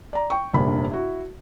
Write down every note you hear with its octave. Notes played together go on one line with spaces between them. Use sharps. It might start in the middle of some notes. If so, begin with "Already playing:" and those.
D5 A#5
G5 C#6
F1 A#1 G2 C3 A#3 B5
E4 F#4